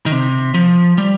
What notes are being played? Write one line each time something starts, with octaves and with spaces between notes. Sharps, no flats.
D#3
C3
F3
G3